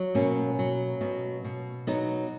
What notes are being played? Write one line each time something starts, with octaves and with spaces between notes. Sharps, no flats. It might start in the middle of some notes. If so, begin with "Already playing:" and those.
Already playing: F#3
B2 A#3 C#4
F#3
B2
B2
F#3 B3 D#4